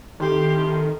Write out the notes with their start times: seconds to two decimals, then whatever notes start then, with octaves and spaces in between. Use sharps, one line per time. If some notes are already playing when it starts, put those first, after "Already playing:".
0.20 C3 D#3 E4 G4 A4 C6